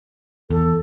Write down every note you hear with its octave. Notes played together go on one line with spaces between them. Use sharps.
E2 A4